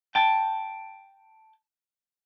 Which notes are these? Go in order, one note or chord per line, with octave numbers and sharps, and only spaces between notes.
G5 A5